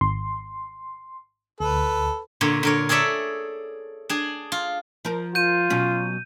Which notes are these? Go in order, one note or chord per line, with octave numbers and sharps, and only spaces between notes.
G#1 C6
D2 A4 B4
A#2 D3 C#5
D3 A#4 C#5
G#4 A4 C#5 D5 E5
D4 G#4
F4
F3 A#4
F4 G6 D#7
B2 F#3 C#4